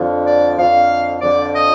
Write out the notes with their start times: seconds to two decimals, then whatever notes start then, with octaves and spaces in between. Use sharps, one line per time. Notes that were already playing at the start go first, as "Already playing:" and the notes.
Already playing: F2 D3 F3
0.26 D5
0.57 F2 D3 F3 F5
1.21 F2 D3 F3 D5
1.53 D#5